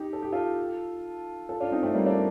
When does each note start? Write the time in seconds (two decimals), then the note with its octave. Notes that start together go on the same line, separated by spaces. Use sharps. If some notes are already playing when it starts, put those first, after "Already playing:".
Already playing: D#4 G4
0.13 A4
0.22 G4
0.32 F4 A4
1.49 F4 A4
1.60 D4 F4
1.72 C4 D#4
1.83 A3 C4
1.94 G3 A#3
2.06 A#3 D4